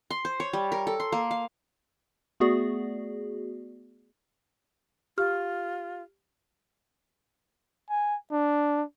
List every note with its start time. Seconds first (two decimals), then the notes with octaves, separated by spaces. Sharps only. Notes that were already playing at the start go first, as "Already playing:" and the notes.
0.10 C6
0.25 C5
0.40 C#5
0.53 G3
0.72 A#4
0.87 A4
1.00 C6
1.12 A#3
1.31 F5
2.40 A3 B3 F#4 G#4 D5
5.18 F4 G4 F6
7.90 G#5
8.32 D4